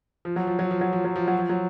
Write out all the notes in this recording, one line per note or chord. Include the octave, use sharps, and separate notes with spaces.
F3
F#3
F3
F#3
F3
F#3
F3
F#3
F3
F#3
F3
F#3